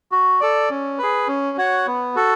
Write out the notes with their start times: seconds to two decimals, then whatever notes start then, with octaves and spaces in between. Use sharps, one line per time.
0.12 F#4
0.41 A4 D5
0.70 C#4
0.98 G#4 B4
1.28 C#4
1.58 F#4 C#5 F#5
1.87 B3
2.16 F#4 A4